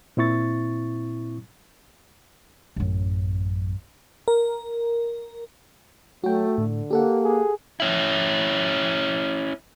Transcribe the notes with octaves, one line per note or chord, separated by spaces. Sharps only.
A#2 C4 E4 C#6 A6
A1 F#2
A#4
F#3 A3 F#4 G5
A2 D3
A#3 G4 A4 F#5
G#4
C#4 E4